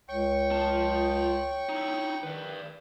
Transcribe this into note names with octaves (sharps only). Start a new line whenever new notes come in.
C#2 C#5 G5 C#6
F4 A5
D#4 E4
D#3 B4 D5